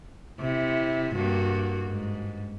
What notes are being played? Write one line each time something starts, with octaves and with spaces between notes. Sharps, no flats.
C3 E4
G2 A#3 F#4
G#2